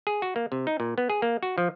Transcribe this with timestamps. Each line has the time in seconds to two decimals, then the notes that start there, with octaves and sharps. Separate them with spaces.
0.07 G#4
0.22 F#4
0.36 A#3
0.52 C3
0.67 D#4
0.80 A#2
0.98 B3
1.10 G#4
1.22 A#3
1.43 F#4
1.58 F3